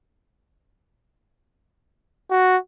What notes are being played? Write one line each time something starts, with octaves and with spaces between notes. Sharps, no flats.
F#4